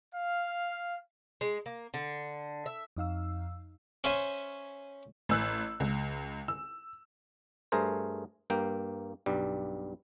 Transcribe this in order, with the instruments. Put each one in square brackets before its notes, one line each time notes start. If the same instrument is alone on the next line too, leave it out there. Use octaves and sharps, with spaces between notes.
[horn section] F5
[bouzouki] G#3
A#3
D3
E5
[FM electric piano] F2 D#4 F5 E6
[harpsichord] C#4 C5 E5 G#5
[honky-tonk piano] A1 E6 F#6
C#2
E6
[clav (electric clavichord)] G2 A3 G#4 A#4 C5
G2 A#3 G5
B1 G2 G3